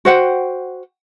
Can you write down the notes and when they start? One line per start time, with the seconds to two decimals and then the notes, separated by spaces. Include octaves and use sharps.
0.05 F#4 C5 F#5 G5